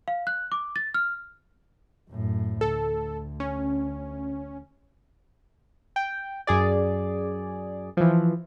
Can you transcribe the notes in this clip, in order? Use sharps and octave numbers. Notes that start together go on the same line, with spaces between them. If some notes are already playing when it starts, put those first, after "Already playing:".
F5
F#6
D6
A6
F6
F#2 A2
D2 A4
C#4
G5
F#2 G#4 D5
E3 F3